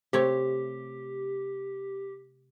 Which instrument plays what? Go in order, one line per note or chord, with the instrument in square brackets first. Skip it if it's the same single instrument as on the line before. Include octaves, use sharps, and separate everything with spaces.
[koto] C3 A3 C#5 [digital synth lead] G4